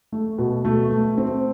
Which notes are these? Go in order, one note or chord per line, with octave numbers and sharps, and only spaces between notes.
A3
B2
A3
A3
C4